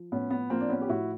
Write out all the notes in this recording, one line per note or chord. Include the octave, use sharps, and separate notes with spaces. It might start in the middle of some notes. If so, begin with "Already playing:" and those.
Already playing: F3
A2 B3 C#4
B3
F3 A#3 C4
D4
B3 C#4
G4
A2 E4 F#4